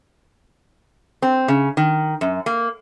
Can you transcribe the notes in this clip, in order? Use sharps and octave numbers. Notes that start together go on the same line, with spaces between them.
C4
C#3
D#3
F#2
A#3